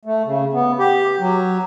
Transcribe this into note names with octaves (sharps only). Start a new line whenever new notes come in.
A3
C#3
B3
G4
F#3